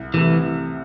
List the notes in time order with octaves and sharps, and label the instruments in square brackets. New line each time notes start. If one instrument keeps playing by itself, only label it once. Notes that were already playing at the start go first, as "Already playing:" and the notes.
Already playing: [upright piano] C2
[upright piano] C3 A3 [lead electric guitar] E3